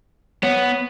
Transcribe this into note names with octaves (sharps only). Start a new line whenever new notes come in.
B3 C#5